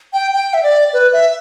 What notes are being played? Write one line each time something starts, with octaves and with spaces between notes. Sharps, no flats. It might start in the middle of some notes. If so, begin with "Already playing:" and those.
G5
G5
E5
D5
B4
E5